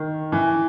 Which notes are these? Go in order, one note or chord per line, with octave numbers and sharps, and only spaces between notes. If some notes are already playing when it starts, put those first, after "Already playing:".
Already playing: D#3
E3